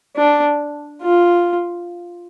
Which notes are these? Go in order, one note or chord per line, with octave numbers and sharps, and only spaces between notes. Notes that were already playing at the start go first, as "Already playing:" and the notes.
D4
F4